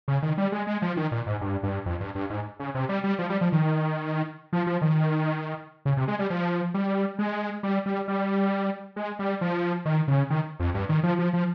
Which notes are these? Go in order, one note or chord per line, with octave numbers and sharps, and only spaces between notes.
C#3
D#3
G3
G#3
G#3
F3
D#3
A#2
G#2
G2
G2
F2
G2
G2
G#2
C#3
C3
G3
G3
F3
G3
F3
D#3
F3
F3
D#3
C#3
C3
G#3
G3
F3
G3
G#3
G3
G3
G3
G#3
G3
F3
D#3
C#3
D#3
F2
G2
D#3
F3
F3
F3